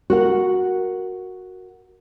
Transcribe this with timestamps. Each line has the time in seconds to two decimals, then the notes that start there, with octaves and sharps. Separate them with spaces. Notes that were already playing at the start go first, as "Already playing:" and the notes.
0.10 F#4 A#4 F#5